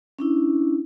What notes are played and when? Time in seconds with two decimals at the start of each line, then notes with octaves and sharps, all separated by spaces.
0.19 C#4 D4 E4